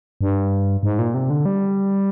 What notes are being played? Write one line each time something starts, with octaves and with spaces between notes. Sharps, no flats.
G2
G#2
A#2
C3
D3
G3